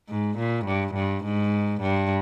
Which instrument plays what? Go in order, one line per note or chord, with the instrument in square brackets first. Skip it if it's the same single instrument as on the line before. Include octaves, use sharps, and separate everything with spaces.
[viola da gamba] G#2
A#2
G2
G2
G#2
G2